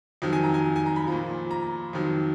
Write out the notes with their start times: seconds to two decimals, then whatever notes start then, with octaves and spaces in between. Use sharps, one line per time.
0.22 F2 D#3 F#3
0.33 G#5
0.44 A#5
0.54 G#5
0.76 G#5
0.86 A#5
0.96 B5
1.07 F3
1.12 A#2
1.51 A#5
1.93 F2 D#3 F#3